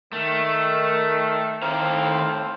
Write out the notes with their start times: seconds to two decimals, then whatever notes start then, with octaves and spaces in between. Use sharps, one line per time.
0.13 D#3 A3
1.62 A2 D#3 C4 F5 A#5